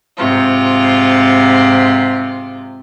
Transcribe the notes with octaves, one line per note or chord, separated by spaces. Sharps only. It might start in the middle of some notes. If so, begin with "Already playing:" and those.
G#2 C3 F4